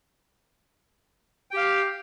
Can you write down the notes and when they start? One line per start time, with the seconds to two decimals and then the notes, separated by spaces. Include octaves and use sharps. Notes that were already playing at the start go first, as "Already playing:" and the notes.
1.51 G5
1.54 G4
1.57 F5